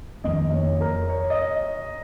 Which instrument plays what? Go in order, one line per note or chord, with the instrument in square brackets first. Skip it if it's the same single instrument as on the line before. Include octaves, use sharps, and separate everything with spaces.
[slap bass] F2 D#3 A#3 C#4 [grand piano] D#5
[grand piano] C#5
A#4
C#5
D#5